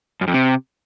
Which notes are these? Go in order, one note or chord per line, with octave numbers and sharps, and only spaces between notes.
F#2
F2
C3